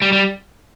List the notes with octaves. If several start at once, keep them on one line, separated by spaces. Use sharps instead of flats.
G3
G3